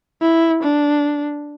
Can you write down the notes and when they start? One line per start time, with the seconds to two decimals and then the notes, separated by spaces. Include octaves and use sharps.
0.22 E4
0.63 D4